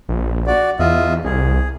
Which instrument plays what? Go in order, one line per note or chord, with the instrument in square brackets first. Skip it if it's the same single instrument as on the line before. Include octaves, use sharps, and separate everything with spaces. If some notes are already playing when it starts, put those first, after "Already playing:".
[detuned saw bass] A#1
[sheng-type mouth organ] F#4 D5
[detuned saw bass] E2 [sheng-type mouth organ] F4 D#5 E5
[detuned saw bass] C2 [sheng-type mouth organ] G#4